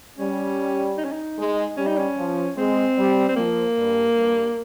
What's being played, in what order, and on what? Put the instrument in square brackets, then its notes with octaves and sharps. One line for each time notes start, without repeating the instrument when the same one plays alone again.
[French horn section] G3 [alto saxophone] C#4
[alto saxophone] D#4
C#4
D#4
[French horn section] G#3
[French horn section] G3 [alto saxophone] C#4
[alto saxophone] D#4
C#4
[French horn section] F3
[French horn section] G#3 [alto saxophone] C4
[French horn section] G3
[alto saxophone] C4
[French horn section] F3 [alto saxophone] A#3
[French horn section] G2
G2